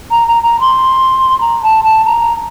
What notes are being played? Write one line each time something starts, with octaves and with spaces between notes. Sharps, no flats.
A#5
A#5
A#5
C6
A#5
A5
A5
A#5